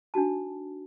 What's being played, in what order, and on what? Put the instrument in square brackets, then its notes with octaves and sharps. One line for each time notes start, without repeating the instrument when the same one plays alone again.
[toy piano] D4 D#4 F#4 A5